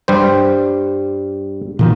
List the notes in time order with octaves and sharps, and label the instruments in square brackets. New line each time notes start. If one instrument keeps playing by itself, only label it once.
[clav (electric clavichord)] G2 G3 C5
[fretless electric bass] A#2 D#3 E3